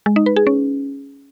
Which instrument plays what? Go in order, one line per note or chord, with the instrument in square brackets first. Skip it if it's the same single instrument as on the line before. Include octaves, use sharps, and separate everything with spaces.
[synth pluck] G#3
D#4
B4
G#4
C#4